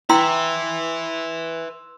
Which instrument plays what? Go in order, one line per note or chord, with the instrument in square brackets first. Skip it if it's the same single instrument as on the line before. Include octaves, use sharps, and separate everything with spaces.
[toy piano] E4 G5 A#5 [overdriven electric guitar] B4 E5 [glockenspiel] C6 E6